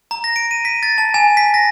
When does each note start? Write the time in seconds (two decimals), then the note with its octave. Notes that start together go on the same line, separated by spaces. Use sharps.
0.11 A#5
0.24 A#6
0.36 D7
0.51 D#7
0.65 B6
0.83 A6
0.98 A5
1.14 G#5
1.37 B6
1.54 A#6